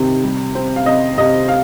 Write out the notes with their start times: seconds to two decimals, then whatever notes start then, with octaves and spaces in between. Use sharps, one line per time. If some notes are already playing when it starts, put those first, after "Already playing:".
Already playing: C3 D#3
0.24 G3
0.55 C4
0.76 F5
0.86 C3 D#5
1.18 C3 D#5
1.48 F5